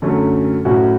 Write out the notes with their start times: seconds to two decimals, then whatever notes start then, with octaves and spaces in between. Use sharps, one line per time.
0.02 F#2 D3 F#3 A3 C#4
0.65 A2 F#3 C#4 F#4